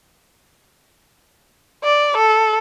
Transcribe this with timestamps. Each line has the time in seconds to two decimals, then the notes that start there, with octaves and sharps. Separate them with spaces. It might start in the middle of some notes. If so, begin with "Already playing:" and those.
1.84 D5
2.17 A4